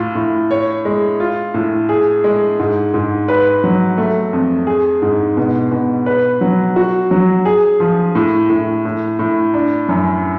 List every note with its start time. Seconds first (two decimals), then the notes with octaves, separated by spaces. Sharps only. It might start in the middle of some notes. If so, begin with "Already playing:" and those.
Already playing: A2 F4
0.15 A2
0.51 C#5
0.85 G#3
1.20 F4
1.54 A2
1.89 G#4
2.24 G#3
2.59 G#2
2.94 G#2
3.28 B4
3.64 F#3
3.98 A3
4.33 F2
4.67 G#4
5.02 G#2
5.37 B2
5.72 B2
6.06 B4
6.41 F#3
6.76 F#4
7.11 F#3
7.45 G#4
7.80 F3
8.15 A2
8.50 A2
8.85 A2
9.19 A2
9.54 D4
9.88 F#2